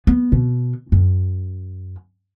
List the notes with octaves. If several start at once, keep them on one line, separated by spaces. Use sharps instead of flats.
B3
B2
F#2